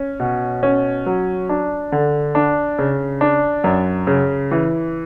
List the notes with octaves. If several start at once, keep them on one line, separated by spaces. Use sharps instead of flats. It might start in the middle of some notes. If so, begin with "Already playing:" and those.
Already playing: C#4
B2
C#4
F#3
D4
D3
D4
C#3
D4
F#2
C#3
E3